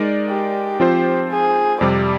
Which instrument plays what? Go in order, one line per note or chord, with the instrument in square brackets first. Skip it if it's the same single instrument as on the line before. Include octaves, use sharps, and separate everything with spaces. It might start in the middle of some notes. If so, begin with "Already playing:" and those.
Already playing: [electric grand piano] G#3 D#4 A#4 D5
[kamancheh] G4
[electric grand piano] F3 C4 F4 C5
[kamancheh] G#4
[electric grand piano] F2 C3 G3 [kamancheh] D5